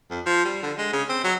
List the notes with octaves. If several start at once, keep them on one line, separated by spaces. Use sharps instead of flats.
F2
F3
G3
D3
G#3
C#3
C4
F#3